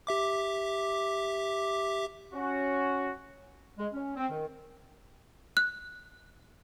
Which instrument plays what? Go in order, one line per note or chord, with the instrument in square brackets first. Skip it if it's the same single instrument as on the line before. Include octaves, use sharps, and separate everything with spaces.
[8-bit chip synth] G4 E5 D6
[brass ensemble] C#4 F#4
[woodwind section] G#3
C#4
C4
D#3
[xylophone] F#6